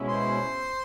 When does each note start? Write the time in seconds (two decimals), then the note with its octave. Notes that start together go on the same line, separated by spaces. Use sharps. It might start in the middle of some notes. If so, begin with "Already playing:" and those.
Already playing: B2 G#3 C#4 E4
0.09 C5 C6